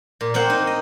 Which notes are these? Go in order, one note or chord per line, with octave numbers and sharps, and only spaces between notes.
A#2
A#3 C4 C5 F#5
D#4
D#5